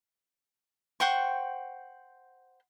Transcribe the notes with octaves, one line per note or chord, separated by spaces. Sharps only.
C5 F#5 G5 C#6